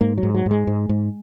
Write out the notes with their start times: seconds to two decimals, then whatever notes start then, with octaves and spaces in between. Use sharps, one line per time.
0.01 G#2 A#3
0.18 F#3
0.23 G#2
0.35 F#3
0.46 G#2 G#3
0.67 G#2
0.89 G#2